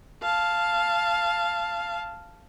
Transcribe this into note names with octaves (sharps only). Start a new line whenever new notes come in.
F5 A5